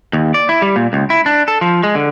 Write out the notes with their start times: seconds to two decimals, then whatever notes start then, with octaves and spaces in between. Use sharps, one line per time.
0.13 D#2
0.34 D5
0.49 E4
0.62 G3
0.76 A#2
0.93 C#2
1.10 E4
1.26 D4
1.48 A4
1.61 F3
1.83 G#3
1.95 D3